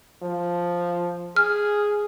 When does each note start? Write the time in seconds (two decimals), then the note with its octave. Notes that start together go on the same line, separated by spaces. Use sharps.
0.22 F3
1.36 G#4 F6